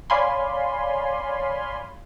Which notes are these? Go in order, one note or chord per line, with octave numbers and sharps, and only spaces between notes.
C#5 D5 F5 G#5 B5 C6